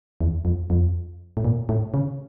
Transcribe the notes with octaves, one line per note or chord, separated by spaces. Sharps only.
E2
F2
F2
A2
A#2
A2
C#3